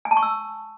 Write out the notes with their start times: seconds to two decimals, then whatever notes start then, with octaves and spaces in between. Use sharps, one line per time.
0.05 G#5
0.11 A5
0.17 C#6
0.23 E6